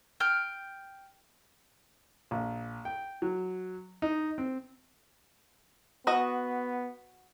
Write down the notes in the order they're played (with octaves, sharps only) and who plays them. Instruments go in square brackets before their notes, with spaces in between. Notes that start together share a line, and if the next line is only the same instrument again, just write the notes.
[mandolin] G5 F6
[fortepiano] A#1
G5
F#3
D#4
C4
[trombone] B3 [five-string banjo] F#4 D#5